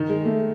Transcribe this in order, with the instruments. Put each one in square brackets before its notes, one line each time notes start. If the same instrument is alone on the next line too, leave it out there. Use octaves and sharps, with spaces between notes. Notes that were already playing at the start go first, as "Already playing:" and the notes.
Already playing: [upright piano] D#3
G#3
A3